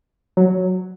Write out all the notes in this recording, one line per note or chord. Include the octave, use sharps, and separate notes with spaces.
F#3